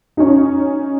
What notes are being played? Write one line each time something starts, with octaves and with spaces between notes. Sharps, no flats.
C#4 D#4